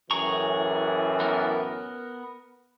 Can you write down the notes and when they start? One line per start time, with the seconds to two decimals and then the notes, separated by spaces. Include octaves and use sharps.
0.11 F#2 A2 E3 G#4 A#5 C#6
1.20 B3 A#4